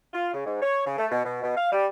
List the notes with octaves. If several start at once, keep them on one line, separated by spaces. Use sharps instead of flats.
F4
C#3
G#2
C#5
C#3
A3
B2
B2
B2
F5
G3